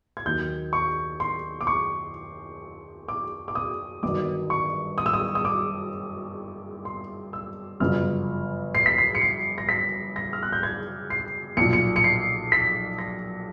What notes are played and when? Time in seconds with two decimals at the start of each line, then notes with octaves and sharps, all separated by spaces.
0.17 G#6
0.26 D#2 D#3 F#3 G6
0.73 C#6
1.20 C6
1.61 D6
1.67 C#6
3.08 D6
3.48 D6
3.55 D#6
4.03 G1 G2 D#3 F#3 D6
4.50 C#6
4.98 D#6
5.06 E6
5.14 D#6
5.35 D#6
5.45 D6
6.85 C6
7.33 E6
7.80 G1 F#2 C#3 F3 F6
8.75 C7
8.86 B6
8.98 C7
9.15 C#7
9.21 C7
9.58 A#6
9.69 B6
10.16 A#6
10.33 F6
10.43 F#6
10.53 G6
10.63 G#6
11.10 C7
11.57 B1 A#2 F3 C#7
11.73 C#7
11.96 C#7
12.04 C7
12.52 B6
12.98 A#6